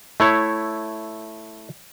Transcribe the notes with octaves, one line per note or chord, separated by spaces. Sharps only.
A3 E4 C#5